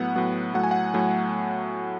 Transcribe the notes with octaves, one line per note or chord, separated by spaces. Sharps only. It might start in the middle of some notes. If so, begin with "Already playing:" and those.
Already playing: A2 F#3 B3 F#5
A2 F#3 B3
A2 F#3 A3 F#5
G#5
F#5
A2 F#3 A3